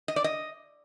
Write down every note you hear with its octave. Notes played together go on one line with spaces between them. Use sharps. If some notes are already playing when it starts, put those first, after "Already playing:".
D#5
D5
D#5